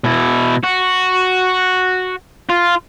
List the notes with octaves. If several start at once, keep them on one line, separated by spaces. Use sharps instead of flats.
B2 E4
F#4
F4